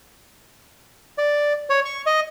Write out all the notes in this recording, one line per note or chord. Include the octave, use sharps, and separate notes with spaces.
D5
C#5
C#6
D#5